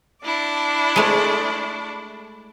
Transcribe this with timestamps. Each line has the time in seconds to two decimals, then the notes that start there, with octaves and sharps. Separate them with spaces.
0.25 D4 E4 D5
0.96 G#3 A3